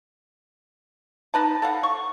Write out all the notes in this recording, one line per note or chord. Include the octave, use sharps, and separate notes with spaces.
D#4 B4 A5
A4 F5 F#5
C#6